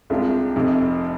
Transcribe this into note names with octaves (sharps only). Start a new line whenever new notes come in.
C2 C3 G#3 D4 F4
F1 F2 C3